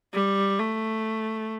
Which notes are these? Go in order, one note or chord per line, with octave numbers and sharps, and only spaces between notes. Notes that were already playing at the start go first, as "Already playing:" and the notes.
G3
A3